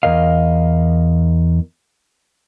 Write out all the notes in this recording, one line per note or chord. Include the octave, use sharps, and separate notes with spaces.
E2 G#2 A#4 D#5 F5